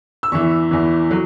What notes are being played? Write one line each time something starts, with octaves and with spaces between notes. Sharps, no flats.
E6
E2 E3 C#6
E2 E3
F#3